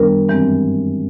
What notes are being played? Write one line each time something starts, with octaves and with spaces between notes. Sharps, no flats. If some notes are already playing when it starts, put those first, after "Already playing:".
Already playing: F#2 D#3 G3 B3 D4 A#4
G2 E3 G#3 C4